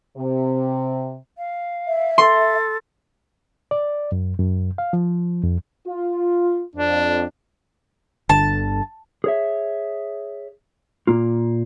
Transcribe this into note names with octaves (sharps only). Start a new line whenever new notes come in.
C3
F5
E5
A4 C6
D5
F#2
F#2
F5
F3
F2
F4
F2 D4
G1 D3 A5
G#4 C#5 E5
A#2 A#3 F4